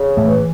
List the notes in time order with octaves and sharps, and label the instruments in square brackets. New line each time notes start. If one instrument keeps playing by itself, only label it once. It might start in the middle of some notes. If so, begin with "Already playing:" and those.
Already playing: [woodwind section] C#3
[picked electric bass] A2 A3 [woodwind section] E3